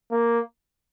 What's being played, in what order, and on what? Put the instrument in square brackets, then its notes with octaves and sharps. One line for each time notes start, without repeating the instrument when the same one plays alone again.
[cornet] A#3